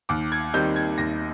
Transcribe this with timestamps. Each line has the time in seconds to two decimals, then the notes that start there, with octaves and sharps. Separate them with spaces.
0.09 D#2 D6
0.32 G#6
0.54 D#3 G3 C4 D#4 G6
0.76 G#6
0.98 D#2 A#6